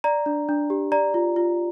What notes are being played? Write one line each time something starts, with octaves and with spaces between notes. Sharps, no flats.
D5 A#5
D4
D4
G4
D5 A#5
F4
F4